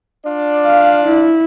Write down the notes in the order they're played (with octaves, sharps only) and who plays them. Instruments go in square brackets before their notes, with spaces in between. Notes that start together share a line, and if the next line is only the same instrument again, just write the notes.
[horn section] D4 F4 D5
[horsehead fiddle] F5
E4